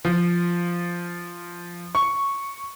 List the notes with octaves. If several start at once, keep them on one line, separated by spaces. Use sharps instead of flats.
F3
C#6